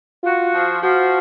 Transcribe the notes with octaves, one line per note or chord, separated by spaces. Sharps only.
F4 F#4
F3
F3 F#4